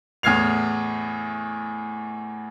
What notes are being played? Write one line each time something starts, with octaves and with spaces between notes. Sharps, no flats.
E2 A2 F6 G#6 C7 F7